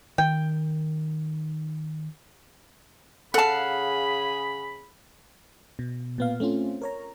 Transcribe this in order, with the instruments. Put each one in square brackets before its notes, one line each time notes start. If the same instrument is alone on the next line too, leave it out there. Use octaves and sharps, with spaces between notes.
[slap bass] D#3 [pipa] G5
[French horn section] C#3 G#4 [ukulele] A4 A5 [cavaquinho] F5 F#5 [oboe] B5
[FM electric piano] B2
A#2 B3 F5
A3 C4 C#4 F4
A#4 C#5 A#5